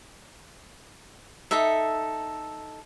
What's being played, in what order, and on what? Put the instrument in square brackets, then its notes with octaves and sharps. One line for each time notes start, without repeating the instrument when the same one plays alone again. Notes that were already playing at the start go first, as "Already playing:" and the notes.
[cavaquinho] D#4 A4 E5